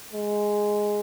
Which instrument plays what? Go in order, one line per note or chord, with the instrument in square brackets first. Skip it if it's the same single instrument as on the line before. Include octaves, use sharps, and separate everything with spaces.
[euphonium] G#3